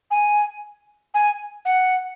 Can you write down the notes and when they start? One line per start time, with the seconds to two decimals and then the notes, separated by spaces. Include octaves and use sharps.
0.10 G#5
1.14 G#5
1.65 F#5